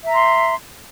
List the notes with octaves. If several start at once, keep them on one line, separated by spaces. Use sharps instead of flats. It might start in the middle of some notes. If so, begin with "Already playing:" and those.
E5 A#5 C6